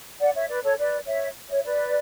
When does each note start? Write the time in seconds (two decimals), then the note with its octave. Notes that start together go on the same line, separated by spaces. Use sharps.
0.20 D5 F#5
0.35 C#5 E5
0.49 B4 D5
0.64 A4 C#5
0.78 B4 D5
1.07 C#5 E5
1.50 C#5 E5
1.65 B4 D5